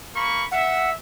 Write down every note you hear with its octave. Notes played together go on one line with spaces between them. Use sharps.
A#3 B5 C#6
E5 F#5